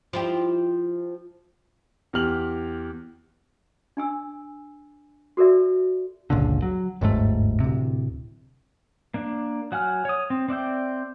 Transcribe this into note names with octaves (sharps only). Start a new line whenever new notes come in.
F3 E4 G4
E2 G4 F6 F#7
D4 G#5 E6
F#4 A4 A#4 D5 E5
G1 C#2 A#2 D3
F#3
G1 D#2 G#2 A3
D1 C3
A#3 D4
F#3 F#5 G#5 F6
C#5 D#6
C4
C4 D5 E5 G5